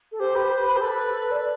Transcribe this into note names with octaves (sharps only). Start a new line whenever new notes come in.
A4
G4 C5
B4
B4
B4
G4
A4 B4
D5